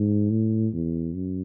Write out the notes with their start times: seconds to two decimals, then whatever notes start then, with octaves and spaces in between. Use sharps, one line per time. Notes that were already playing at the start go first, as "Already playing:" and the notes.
Already playing: G#2
0.31 A2
0.73 E2
1.14 F#2